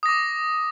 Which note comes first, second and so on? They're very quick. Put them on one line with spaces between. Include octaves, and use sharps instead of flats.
D#6 A#6 D6